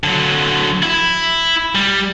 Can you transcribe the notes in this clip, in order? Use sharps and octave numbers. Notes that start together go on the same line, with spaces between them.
D3 F#3
E4
G3